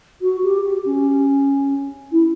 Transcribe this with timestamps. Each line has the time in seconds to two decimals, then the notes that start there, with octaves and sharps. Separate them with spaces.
0.22 F#4
0.44 G4
0.63 G4
0.86 C#4
2.12 E4